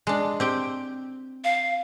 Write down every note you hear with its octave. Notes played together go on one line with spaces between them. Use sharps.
G#3 D4
C4 G4 G5
F5